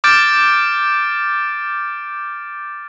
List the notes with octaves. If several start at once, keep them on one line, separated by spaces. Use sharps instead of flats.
D6 F6 G6 A6 D7